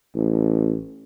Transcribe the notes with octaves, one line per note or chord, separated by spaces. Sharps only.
A1